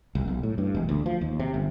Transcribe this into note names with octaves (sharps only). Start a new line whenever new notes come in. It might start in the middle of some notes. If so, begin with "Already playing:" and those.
C2
B1
A2
G2
E1
D2
F3
D#2
C3
G1